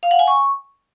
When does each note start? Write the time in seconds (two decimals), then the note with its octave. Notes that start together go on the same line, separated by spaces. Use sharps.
0.03 F5
0.11 F#5
0.19 G#5
0.28 C#6